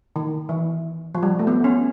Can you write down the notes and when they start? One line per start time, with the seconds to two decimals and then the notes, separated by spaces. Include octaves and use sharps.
0.16 D#3
0.49 E3
1.15 F3
1.23 G3
1.39 A3
1.47 B3
1.64 C#4